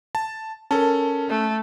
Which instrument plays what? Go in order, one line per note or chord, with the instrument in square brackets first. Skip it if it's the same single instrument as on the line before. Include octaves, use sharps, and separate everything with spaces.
[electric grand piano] A5
[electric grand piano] C#4 A4 [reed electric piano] A#4 A5
[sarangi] A3